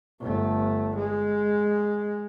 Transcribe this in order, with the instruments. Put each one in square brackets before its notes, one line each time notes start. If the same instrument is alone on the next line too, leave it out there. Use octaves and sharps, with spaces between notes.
[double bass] G1 A3
G#3